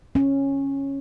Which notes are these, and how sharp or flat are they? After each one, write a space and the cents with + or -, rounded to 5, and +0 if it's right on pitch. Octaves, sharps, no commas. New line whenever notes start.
C#4 -10